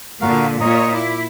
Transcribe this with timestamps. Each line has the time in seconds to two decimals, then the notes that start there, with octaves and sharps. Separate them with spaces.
0.22 A#2 D3 F#4 A#4 F5
0.61 A#2 C#5 D#5 A#5 D#6
0.94 E4 D6